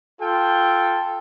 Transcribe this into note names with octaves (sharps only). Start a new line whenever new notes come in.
F4 A4 G5